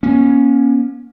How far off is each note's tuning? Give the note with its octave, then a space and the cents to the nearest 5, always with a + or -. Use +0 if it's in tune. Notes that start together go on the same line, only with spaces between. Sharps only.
A#3 +45 C#4 +0